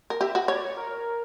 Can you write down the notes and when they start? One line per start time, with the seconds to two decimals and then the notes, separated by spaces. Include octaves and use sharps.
0.10 A#4
0.21 G4 E5
0.35 F#4
0.48 C#5 D5
0.63 C#5
0.77 A#4